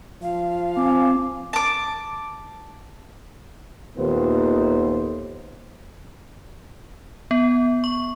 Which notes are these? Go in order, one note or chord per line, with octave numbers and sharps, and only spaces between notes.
F3 F5
C4 C5 G#5 D6
A5 D6
D#2 A#2 D#3 A3 B3 C5
B3
C#6